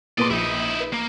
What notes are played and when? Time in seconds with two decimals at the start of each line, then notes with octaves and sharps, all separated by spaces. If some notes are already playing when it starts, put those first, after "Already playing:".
0.18 A#2 B4 D5 D#5 C6
0.30 A#1 D#4 E4
0.80 B4
0.93 A#3